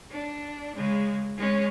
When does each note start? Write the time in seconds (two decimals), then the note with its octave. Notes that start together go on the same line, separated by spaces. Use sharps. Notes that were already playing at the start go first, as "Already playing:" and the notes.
0.11 D4
0.76 C#3 G#3
1.37 G#3 C#4